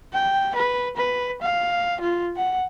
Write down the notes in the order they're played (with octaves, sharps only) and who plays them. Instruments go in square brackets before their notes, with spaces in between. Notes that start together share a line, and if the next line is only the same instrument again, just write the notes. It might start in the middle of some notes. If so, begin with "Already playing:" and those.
[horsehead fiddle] G5
B4
B4
F5
F4
F#5